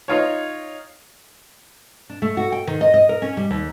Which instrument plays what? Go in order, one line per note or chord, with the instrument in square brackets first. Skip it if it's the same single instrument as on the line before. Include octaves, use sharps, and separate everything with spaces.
[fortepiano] D#4 F4 C#5
[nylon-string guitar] D4
A3
F#4
G5
D#3
D#5
D#5
A#4
C#4
G3
D#2